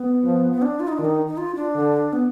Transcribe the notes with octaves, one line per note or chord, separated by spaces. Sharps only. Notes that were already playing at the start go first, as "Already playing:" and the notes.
Already playing: B3
F3
B3
D4
F4
D#4
D4
D#3
D#4
D#4
F4
D4
D3
B3